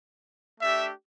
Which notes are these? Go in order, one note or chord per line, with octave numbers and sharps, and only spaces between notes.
A3 D4 G4 E5